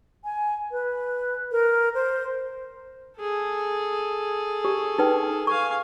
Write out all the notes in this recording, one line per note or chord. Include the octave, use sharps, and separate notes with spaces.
G#5
B4
A#4
C5
G#4 A4
G4
D#4 B4 G5
F5 G#5 C#6